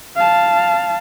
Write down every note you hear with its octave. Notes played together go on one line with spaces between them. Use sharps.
F5 A5